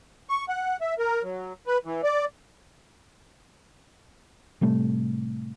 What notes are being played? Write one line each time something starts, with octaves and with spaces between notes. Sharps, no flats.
C#6
F#5
E5
A#4
F#3
B4
E3
D5
A2 C3 G3 A3